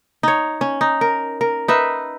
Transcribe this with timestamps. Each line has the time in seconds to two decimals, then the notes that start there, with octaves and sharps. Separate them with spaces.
0.23 D#4 C#5
0.61 C#4
0.81 D#4
1.01 A#4
1.41 A#4
1.68 D#4 B4 E5